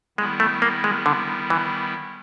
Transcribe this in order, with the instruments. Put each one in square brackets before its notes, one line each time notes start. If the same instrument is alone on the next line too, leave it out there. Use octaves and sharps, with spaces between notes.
[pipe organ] D#3 G3 B3 E4 [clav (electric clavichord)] G#3
[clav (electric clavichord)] A3
A#3
G#3
D3
E3